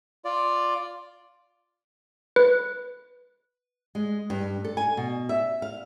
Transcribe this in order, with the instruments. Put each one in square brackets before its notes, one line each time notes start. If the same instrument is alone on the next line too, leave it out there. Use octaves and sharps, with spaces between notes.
[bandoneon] F4 D5
[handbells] B4
[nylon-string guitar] G#3
G2
A4
G#5
B2
E5
F5